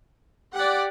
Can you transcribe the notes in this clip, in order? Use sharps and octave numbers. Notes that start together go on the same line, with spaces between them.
G4 D5 F#5